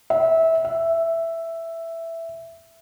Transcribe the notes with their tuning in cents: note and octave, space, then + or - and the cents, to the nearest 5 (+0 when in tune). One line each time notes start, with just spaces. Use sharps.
E5 -20
E5 +5